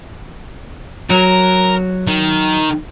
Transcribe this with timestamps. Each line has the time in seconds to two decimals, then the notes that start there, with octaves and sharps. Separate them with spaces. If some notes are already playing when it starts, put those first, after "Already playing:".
1.10 F#3 A#4
2.07 D#3